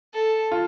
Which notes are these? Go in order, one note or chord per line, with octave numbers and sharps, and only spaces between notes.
A4
F4